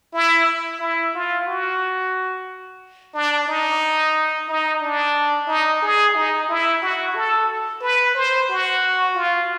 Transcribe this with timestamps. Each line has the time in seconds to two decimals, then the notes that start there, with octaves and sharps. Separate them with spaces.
0.14 E4
0.80 E4
1.15 F4
1.47 F#4
3.14 D4
3.48 D#4
4.48 D#4
4.81 D4
5.48 D#4
5.82 G#4
6.15 D#4
6.49 E4
6.82 F#4
7.15 A4
7.81 B4
8.15 C5
8.49 F#4
9.15 F4